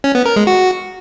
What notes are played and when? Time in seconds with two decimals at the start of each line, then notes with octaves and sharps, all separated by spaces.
0.04 C#4
0.15 B3
0.26 A#4
0.36 G#3
0.47 F#4